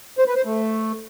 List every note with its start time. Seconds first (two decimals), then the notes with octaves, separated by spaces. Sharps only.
0.18 C5
0.27 B4
0.36 C5
0.45 A3